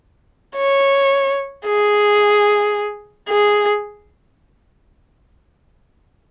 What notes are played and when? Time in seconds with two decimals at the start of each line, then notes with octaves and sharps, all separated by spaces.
0.56 C#5
1.66 G#4
3.30 G#4